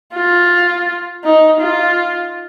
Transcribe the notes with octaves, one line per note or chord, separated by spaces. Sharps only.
F4
D#4
F4